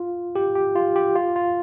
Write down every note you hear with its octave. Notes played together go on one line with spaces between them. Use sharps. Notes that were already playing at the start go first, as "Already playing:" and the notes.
Already playing: F4
G4
G4
F4
G4
F4
F4